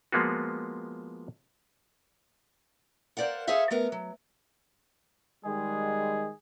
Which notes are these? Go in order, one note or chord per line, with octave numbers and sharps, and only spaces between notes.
F3 G#3 A#3 B3 F4 F#4
A#4 C5 D5 F5 F#5
G#4 A4 C5 C#5 E5 F5
A3 B3 A#4
F#3
D#3 G3 G#3 G#4